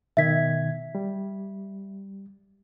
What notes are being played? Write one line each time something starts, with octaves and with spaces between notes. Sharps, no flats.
B2 D#3 E5 G#6 B6
G3